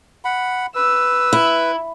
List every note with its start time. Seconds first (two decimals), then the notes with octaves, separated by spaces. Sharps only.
0.25 F#5 B5
0.75 B4 E6
1.33 E4